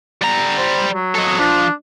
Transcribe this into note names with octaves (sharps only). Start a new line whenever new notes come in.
G3 A#5
C5
F#3
A4 D#5
F3 D4